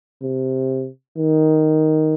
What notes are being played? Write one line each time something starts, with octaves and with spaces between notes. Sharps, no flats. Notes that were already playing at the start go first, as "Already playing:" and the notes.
C3
D#3